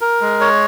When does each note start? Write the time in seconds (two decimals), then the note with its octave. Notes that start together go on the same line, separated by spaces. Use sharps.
0.01 A#4
0.21 G#3
0.41 C#5